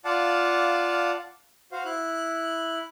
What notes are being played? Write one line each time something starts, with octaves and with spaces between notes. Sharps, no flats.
F4 D5 F5 F#5 A5
F#4 C5 F5
E4 F#6